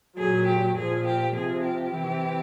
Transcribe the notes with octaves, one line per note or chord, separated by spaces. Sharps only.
A#2 F#3 G#4
G4
A#2 F3 G#4
G4
C3 F3 G#4
G4
C3 E3